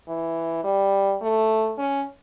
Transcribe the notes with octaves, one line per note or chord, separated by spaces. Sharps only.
E3
G3
A3
C#4